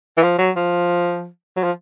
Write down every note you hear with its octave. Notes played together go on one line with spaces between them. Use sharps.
E3
F3
F#3
F3
F#3
F3